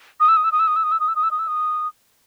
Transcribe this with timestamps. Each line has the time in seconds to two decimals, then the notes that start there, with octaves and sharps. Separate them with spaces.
0.20 D#6
0.28 E6
0.36 D#6
0.44 E6
0.52 D#6
0.59 E6
0.67 D#6
0.76 E6
0.83 D#6
0.92 E6
1.00 D#6
1.08 E6
1.15 D#6
1.23 E6
1.31 D#6
1.39 E6
1.47 D#6